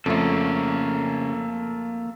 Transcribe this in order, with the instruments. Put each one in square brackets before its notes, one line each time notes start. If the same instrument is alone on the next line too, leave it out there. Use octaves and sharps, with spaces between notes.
[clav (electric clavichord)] F2 A3 [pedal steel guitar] C#3 C#4 [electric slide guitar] A#3 A4